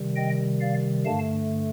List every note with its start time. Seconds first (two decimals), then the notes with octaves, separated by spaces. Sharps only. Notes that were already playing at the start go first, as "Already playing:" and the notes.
Already playing: C3 D#3 G3
0.16 D#5 G5
0.60 D5 F5
1.05 G2 D3 A3 F5 A5